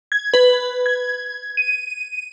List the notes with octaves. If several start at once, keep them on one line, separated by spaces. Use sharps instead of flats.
G#6
B4
G#6
D#7